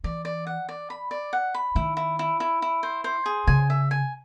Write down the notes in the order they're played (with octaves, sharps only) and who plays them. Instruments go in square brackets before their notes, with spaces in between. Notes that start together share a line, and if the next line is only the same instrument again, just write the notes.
[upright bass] E3 [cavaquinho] D5
[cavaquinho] D5
F#5
D5
B5
D5
F#5
B5
[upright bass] D#3 [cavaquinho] E4
[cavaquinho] E4
E4
E4
E4
C5
C5
G#4
[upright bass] C#3 [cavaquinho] G#5
[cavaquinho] E5
G#5